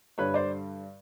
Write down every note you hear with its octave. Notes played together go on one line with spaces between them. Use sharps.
G2 D3 G3 B4 C#5
C5 D5